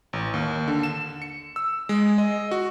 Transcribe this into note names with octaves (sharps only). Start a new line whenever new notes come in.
A1
D#2
D3
E7
C#7
E6
G#3
D#5
F#4